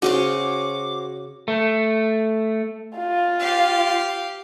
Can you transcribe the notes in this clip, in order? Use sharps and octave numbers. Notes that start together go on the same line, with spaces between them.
C#3 F#4 G#4 C5 C#5 D6
A3
F4
G4 F5